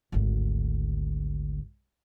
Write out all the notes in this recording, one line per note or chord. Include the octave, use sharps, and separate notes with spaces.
G#1 D2